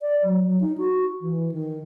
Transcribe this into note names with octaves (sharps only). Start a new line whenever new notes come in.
D5
F#3
F#3
D#4
F#4
E3
D#3